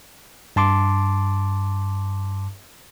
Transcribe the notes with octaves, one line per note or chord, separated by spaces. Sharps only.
G2 A5 C6 D6